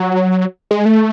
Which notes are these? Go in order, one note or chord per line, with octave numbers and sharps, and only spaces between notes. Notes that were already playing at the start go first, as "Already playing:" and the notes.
Already playing: F#3
G#3
A3